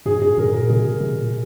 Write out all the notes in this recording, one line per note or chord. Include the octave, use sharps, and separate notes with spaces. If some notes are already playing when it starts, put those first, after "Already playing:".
G2 G#4
G#4
A#2 A#4
A#4
C3 G#4
C3
A#2
C3